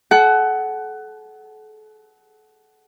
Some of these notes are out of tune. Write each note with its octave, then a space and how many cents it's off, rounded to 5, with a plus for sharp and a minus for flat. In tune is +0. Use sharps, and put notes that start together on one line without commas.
A4 -35 F#5 +15